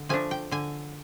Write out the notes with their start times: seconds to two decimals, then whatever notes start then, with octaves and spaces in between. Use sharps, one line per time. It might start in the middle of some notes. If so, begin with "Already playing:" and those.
Already playing: D3
0.09 F3 A3 D4 G#5
0.31 G5
0.51 D3 G#5